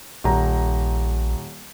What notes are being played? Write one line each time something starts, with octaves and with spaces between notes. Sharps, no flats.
D#1 A#1 A#5